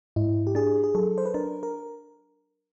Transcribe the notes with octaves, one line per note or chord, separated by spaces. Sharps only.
G#2 E4
G4
D4 G#4
G#4
F#3 A4
C5
B4
D4 A#4
A#4